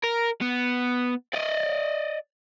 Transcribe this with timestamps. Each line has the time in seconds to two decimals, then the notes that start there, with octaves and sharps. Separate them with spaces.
0.03 A#4
0.41 B3
1.33 D5 D#5